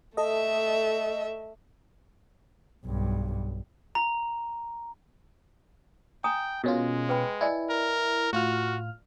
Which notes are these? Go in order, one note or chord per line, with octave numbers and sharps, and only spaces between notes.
A3 A4 D#5 E5
B1 G2
A#5
G5 G#5 A#5 D#6
B2 G#3 C#4 F4 A#4
B4 G5 B5
E4 D5 D#5 G#5
A#4
A2 F4 F#4 F6